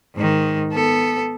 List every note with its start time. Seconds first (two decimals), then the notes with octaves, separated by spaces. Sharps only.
0.15 G#2 D#3
0.73 B3 A4